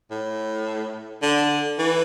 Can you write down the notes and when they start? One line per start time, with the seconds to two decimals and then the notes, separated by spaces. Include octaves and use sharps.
0.11 A2
1.22 D3
1.78 E3